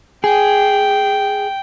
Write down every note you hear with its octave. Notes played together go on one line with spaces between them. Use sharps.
G#4 G5